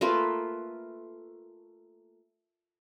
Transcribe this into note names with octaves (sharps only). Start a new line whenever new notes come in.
A3 A#3 F4 B4